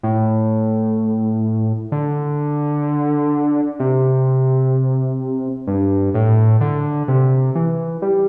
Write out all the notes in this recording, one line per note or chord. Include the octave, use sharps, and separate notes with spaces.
A2
D3
C3
G2
A2
D3
C3
E3
G3